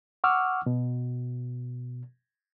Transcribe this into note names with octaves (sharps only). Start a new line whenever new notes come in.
F#5 C#6 D6 E6 F6
B2